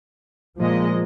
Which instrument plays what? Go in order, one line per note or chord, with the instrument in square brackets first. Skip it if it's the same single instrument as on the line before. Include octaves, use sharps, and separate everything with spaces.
[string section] A#2 G#3 D#5 [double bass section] F3 A#3